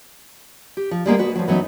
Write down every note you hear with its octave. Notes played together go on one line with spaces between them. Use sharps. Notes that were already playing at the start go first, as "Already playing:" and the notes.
G4
F3
G3 G#3 A#3 B3
F#4 B4
F3 F#3
E3 F#3 B3 C#4 D#4